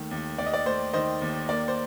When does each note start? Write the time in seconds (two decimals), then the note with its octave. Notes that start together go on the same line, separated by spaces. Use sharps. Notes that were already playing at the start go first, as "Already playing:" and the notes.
Already playing: D#2 D#3 A3
0.11 D#2
0.38 D#2 D5
0.46 D#5
0.54 D5
0.65 A3 C5
0.93 D#3 C5 D#5
1.22 D#2
1.49 A#3 D5
1.68 C5